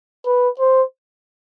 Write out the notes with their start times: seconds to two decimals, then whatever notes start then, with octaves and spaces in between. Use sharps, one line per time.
0.26 B4
0.59 C5